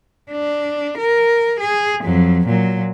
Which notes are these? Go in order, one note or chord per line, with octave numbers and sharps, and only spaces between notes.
D4
A#4
G#4
F2 F#3
A#2 F#3